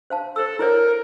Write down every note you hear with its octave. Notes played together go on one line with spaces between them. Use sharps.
C5 F5 A5
A4 C5 E6
E4 A#4 C5 C#5